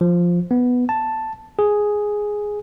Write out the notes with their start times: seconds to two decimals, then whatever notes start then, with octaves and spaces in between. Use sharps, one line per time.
0.01 F3
0.51 B3
0.89 A5
1.59 G#4